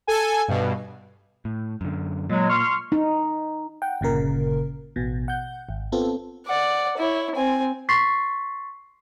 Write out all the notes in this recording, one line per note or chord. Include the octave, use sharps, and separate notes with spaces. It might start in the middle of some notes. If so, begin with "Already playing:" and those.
A4 G#5
G2 B2
A2
F#2 D3
A#2 F#3 G#3
C6 C#6 F6
D#4
F#5 G5
G1 A#2 C#3 A#4
A1 B2
F#5 G6
G#1
B3 C4 F4 A4
D5 F#5
E4 C#5
C4 G#5
C6 C#6 A6 B6 C7